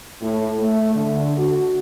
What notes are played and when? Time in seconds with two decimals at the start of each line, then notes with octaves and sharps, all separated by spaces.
0.22 A2
0.59 A3
0.95 D3
1.38 F#4